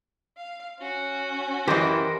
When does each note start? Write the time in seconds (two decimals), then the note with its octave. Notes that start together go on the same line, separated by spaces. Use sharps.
0.37 F5
0.79 C#4 F#4
1.68 F#2 E3 G4 A#4 C5 D#5 G5